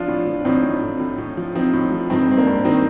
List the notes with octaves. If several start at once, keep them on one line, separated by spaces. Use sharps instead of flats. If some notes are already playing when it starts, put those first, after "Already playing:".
Already playing: F3 D4 F4
A2
F3
D4
A2 C4 D#4
A2
A2
A2
A2
F3
F3 C4 D#4
A2
F3
G2 C4 D#4
G2 C4
A#3 D4
G2
D#3 C4 D#4